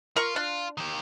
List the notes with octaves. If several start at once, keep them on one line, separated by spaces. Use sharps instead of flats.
F4 A#4 C#6
D4 F4
D#3 G4